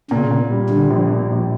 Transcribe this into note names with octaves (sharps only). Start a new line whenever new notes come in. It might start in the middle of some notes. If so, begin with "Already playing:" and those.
A#2 C#3
A#2
G3
D3 G3
A#1
A#2
A#1